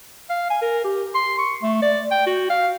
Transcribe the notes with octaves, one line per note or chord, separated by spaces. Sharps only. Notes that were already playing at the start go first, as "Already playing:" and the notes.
F5
G#5
A#4
G4
C6
C#6
A3
D5
G5
F#4
F5